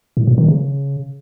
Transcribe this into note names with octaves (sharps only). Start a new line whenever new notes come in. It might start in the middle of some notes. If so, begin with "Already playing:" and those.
A2
A#2
D#3
C#3